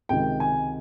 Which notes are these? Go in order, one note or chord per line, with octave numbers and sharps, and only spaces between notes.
C#2 C3 D#3 G5
G#5